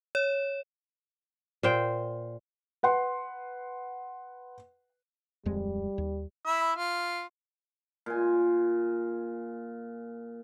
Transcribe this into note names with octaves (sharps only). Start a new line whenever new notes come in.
C#5
A#2 C5 G5
B4 F#5 C6
D1 F2 G3 G#3
D#2
E4 E5
F4
A#2 G#5